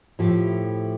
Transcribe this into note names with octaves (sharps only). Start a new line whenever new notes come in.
A2 F3 A3 E4 G4